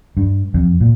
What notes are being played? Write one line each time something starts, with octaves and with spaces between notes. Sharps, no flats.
G2
F2
A#2